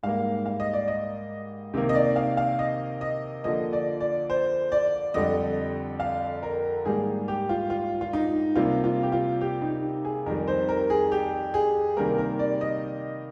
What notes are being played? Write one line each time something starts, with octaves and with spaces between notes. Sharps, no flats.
G#2 G3 A#3 F5
F5
D#5
D5
D#5
C3 D#3 A#3
D#5
D5
F5
F5
D#5
D#5
D3 F3 A#3 D#5
D5
D5
C5
D5
F2 D3 G3 D#5
F5
A#4
G#2 D#3 G3 A#3 G#4
G4
F4
F4
F4
D#4
C3 G3 A#3 F4
F4
G4
F4
G4
D#4
G#4
F2 D#3 G3 A#4
C5
A#4
G#4
G4
G#4
C3 D#3 G3 A#3 A#4
A#4
D5
D#5